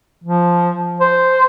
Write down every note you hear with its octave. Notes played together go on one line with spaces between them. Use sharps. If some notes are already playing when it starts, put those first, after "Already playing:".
F3
C5